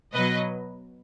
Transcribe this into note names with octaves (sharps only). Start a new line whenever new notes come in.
B2 F#3 B4 D#5